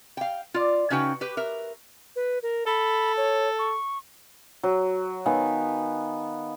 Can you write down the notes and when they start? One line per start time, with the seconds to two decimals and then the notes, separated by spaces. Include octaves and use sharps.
0.17 F5 G5
0.54 F4 D5
0.90 C#3 C#4 D#4 F#4 B4 G5
1.21 G4 B4
1.37 A#4 E5
2.16 B4
2.43 A#4
2.67 A4 B5
3.17 C#5
3.59 C#6
4.63 F#3
5.26 D#3 B3 F5 G#5